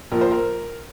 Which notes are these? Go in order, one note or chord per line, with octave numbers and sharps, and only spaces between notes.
A#1 A#2 F3 A#4
C5
A#4